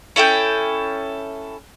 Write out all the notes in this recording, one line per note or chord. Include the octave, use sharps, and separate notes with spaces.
C#4 E4 A4 G5